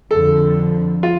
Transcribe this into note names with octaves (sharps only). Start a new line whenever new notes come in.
F2 D3 F3 A4
F4